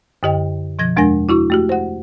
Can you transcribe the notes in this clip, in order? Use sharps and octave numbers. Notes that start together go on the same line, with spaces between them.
F#2 D3 G4 D#5 G5
B2 F3 G#6 A#6
E2 G#3 D4 A#4 G#5 A#6
E4 F#4 C#6
A3 F#4 G4
C5 F#5